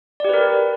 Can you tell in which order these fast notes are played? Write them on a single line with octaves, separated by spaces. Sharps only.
D5 G4 B4 A#4